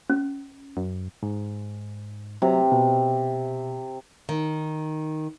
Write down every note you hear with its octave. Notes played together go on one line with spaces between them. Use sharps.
C#4
F#2
G#2
C3 F#3
B2
D#3